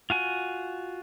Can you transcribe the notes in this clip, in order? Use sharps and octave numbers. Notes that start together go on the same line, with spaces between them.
F4 F#4 G#5